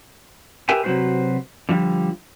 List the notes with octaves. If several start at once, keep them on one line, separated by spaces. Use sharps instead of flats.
G4 A#4 B4 E5 G5 G#5
C3 F#3 C4 F#4 B4 C5
D3 F3 G3